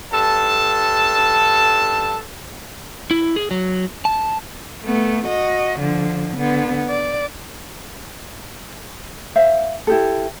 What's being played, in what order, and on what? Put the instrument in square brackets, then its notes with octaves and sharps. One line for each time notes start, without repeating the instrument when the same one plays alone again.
[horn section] G2 A4 A5
[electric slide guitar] E4
G#4
F#3
A5
[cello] A3 B3
F#4 D#5
D3 F3
D3 B3
D5
[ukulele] C5 E5 F5
E4 G4 A4